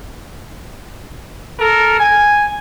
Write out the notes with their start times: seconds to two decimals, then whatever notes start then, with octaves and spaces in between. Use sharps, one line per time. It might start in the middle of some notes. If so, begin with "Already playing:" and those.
1.59 A4 A#4
1.99 G#5